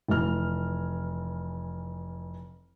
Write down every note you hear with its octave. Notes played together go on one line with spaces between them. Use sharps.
F1 E3 F6